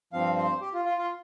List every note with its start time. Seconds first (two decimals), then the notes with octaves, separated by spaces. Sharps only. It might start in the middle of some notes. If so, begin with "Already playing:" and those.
0.13 G2 F3 C4 F5
0.37 C5
0.61 G4
0.74 F4
0.85 F4
0.98 F4